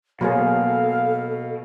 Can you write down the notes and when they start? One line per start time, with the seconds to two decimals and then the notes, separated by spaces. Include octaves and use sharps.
0.21 B2 F#3 A#3 G#4 A4 F5